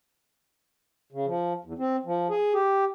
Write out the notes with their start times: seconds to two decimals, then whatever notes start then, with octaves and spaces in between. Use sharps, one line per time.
1.12 C#3
1.26 F3
1.65 E2
1.79 C4
2.05 F3
2.30 G#4
2.54 G4